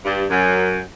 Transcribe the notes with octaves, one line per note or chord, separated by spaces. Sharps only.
G2
F#2